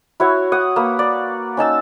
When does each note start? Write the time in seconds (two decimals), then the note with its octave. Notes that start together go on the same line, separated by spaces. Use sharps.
0.20 E4 F#4 C#5
0.52 F#5 D#6
0.76 A#3 B4
0.99 D5
1.57 C#4 D#4 A5 E6